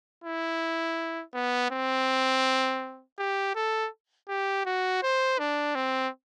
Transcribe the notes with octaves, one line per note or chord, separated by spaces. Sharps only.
E4
B3
C4
G4
A4
G4
F#4
C5
D4
C4